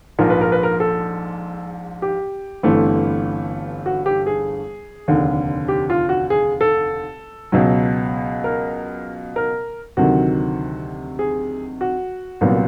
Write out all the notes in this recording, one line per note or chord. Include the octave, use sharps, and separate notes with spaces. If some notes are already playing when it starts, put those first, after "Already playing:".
A#1 G#2 F3 A#4
B4
A#4
B4
A#4
A4
G4
G1 G2 E3 A3 C4
F#4
G4
G#4
F1 D#2 D3
G4
F4
F#4
G#4
A4
C#2 B2 F#3
A#4
A#4
D2 C3 D#3 F#3 F#4
G#4
F#4
C2 A#2 F#3 B3